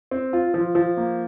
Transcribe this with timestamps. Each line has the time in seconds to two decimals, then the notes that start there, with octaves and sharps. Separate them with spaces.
0.11 C4
0.33 F4
0.54 F3
0.75 F3
0.97 A#3